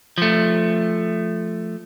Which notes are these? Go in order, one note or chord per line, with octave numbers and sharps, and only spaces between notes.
F3 A3